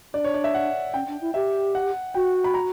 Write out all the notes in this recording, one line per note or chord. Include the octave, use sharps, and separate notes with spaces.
D4 D5
C#5
D5
E5
F#5
C#4 G5
D4
E4
G4 E5
F#5
F#4 G5
B5
A#5